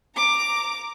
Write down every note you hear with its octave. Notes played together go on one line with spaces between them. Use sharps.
A#5 D6